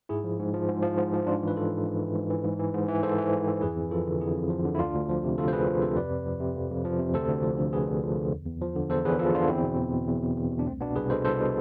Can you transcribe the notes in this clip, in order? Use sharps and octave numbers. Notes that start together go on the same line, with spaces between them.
G#2 E4 G#4
F3
G#2
F3
G#2
F3
G#2
F3
G#2 D4 F4
E3
B4
G#2 F4 A4
E3
G#2
E3
G#2
E3
G#2
E3
G#2
E3
G#2 A4 C5
E3
G#2
E3
F2 G#4 B4
F2
F3 F4 A4
D3
F2 E4 G#4
F2
F3
D3
E4
D2 D4 F4
D2
F3
C3
D2 F4 A4
C5
D2 G#4 B4
F3
C3 A4 C5
F2 B4 D5
F2
F3
C3
F2
F2
F3
C3
D2 A4 C5
D2
F3
D3
D2 G#4 B4
D2
F3
D3
E2
E2
F3
D3
E2 A4 C5
E2 G#4 B4
F3 F4 A4
D3 D4 F4
E2 C4 E4
B2
E2
B2
E2
B2
E2
B2
D4
C2 A3 C4
B2 B3 D4
C2 G#4 B4
B2 A4 C5
C2 A4 C5
B2